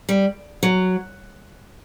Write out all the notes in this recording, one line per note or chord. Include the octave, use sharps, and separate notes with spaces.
G3
F#3